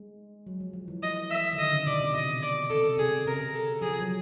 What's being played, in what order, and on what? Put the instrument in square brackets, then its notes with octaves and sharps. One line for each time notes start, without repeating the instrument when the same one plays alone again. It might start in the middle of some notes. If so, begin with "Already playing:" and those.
Already playing: [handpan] G#3
F#3
F3
F3
E3
[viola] D#5
E5
[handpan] D#3
[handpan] D3 [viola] D#5
[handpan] C#3
[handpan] B2 [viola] D5
[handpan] C3
[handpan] B2 [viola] D#5
[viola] D5
[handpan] C3 [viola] A4
[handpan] C3 [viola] G#4
[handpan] C#3 [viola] A#4
[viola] A4
[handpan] F3 [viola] G#4
[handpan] F#3